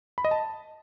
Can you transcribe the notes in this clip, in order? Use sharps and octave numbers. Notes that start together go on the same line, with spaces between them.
B5
D#5
A5